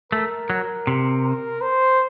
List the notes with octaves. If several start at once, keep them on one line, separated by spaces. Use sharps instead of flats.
A3 A#4
F#3
C3
C5